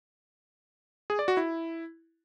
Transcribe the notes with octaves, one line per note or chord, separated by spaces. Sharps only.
G#4
D5
F#4
E4